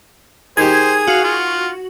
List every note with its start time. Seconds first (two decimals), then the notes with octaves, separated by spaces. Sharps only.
0.57 D#3 G4 G#4 C5 G#6
1.07 F#4 F5
1.24 F4